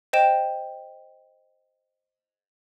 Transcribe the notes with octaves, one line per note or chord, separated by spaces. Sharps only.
C5 D#5 G5 E7